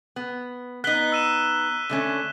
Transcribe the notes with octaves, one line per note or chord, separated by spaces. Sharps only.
B3
B3 D#4 F#6 B6 G7
E6 D#7 E7
D3 A3 C#4